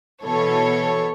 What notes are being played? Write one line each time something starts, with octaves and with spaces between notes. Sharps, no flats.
B2 E3 A4 C#5